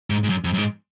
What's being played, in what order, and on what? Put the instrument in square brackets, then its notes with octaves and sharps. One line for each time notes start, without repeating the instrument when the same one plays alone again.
[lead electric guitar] G#2
G#2
F#2
F2
F#2
G#2